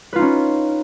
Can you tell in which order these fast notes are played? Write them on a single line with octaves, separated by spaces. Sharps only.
B4 F4 D#4 C#4